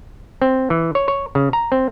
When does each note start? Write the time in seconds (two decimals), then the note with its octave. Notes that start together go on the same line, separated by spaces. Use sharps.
0.42 C4
0.70 E3
0.95 C#5
1.08 C#5
1.35 C#3
1.53 A#5
1.72 C4